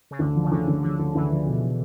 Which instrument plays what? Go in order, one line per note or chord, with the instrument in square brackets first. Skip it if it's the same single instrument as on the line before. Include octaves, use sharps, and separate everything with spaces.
[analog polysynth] C#3
[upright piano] D2 [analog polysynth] D3
[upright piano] F3
[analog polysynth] C#3
[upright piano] D2 [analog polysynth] D3
[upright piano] D2
[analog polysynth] D3 [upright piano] F3
[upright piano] D2
[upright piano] D2 [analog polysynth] E3
[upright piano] F3
B2